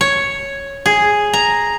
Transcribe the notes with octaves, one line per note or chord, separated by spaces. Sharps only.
C#5
G#4
A#5